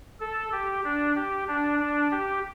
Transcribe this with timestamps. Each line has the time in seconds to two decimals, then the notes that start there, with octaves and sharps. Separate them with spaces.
0.20 A4
0.52 G4
0.84 D4
1.16 G4
1.48 D4
1.79 D4
2.11 G4